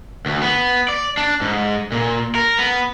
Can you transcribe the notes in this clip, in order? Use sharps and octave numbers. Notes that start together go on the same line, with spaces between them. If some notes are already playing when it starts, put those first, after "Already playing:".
D2
B3
D5
D4
G#2
A#2
A#4
B3